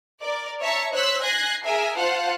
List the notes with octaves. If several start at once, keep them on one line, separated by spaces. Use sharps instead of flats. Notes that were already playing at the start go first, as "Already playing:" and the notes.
A#4 D5
C#5 E5 A5 A#5 C#6
C5 C#5 E6 F#6 B6
G#5 F#6 G#6 A#6 C7
G#4 A#4 E5 G#5
F4 C5 F5 F#5 A5